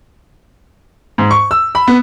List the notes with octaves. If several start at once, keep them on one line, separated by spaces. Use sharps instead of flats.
G#2
C#6
E6
B5
B3